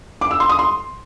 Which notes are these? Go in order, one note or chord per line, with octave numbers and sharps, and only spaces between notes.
D6
E6
C6
D#6
C6